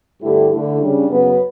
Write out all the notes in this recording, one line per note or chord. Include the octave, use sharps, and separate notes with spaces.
G2 D3 A3 E4 G4
D3 A3 E4
C#3 G3 D4
F#2 C#3 F#3 B3